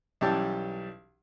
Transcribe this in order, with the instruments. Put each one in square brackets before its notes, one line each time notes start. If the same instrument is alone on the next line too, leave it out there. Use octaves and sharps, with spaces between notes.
[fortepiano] B1 E3 G3 C#4 G4 A5